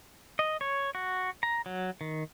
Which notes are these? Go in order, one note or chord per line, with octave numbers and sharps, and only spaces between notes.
D#5
C#5
F#4
A#5
F#3
D#3